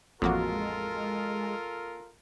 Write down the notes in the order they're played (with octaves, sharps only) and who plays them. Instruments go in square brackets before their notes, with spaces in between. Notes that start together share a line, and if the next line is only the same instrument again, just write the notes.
[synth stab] A1 A#3 F#4 [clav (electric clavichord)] F2 [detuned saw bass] G#3 [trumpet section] F4 A4 A#4